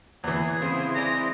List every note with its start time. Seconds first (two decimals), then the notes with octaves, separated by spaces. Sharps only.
0.24 E2 E3 G#4
0.62 C#3 E3 B3 C4 C5
0.94 G#3 G#4 D5 A#5